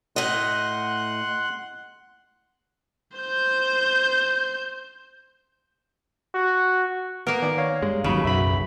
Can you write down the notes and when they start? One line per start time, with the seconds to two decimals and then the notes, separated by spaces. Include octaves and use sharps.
0.16 A2 D#5 F#5 C6 F#6
3.18 C5 G6
6.34 F#4
7.27 A#3 B3 A#4
7.42 D#3 D5 G#5
7.58 C#5 F5
7.82 G2 G#3
8.04 G1 D#2 G#2 C#3 F#3 C#4 B5
8.25 B1 F#2 F#4 E5 B5 B6